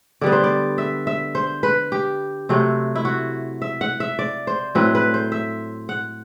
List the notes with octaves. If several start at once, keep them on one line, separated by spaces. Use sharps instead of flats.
D3 G3 B3 D5
C5
D5
E5
E5
C5
B4
G4
C3 F#3 A3 C4
E4
F#4
E5
F#5
E5
D5
C5
A2 F#3 C4 B4
B4
C5
E5
F#5